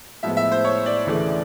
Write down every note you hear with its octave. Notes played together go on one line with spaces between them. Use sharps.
A2 F3 G#3 B3 E5
E5
C5
C#5
D5
D2 C#3 E3 A3